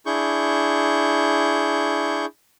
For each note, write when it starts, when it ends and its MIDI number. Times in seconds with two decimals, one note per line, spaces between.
0.06 2.26 62
0.06 2.26 64
0.06 2.26 68
0.06 2.26 85
0.06 2.26 91